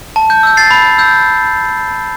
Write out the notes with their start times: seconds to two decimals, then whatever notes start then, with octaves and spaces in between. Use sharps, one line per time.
0.16 A5
0.30 G6
0.43 E6 G6
0.57 A6 C7
0.71 B5
0.98 E6 G6